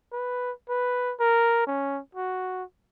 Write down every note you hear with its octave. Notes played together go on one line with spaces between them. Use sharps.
B4
B4
A#4
C#4
F#4